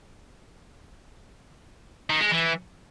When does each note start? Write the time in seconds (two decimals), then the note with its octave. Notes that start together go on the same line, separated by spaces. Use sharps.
2.10 D#3
2.21 G#3
2.31 E3